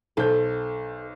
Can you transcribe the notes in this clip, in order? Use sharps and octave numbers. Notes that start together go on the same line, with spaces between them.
B1 A4 C5 G6